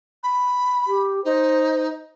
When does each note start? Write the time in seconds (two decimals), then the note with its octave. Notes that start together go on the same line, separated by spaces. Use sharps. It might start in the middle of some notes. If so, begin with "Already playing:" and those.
0.23 B5
0.87 G4
1.25 D#4 C5